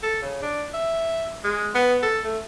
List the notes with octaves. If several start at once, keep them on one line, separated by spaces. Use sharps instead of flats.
A4
C#3
D4
E5
G#3
B3
A4
A3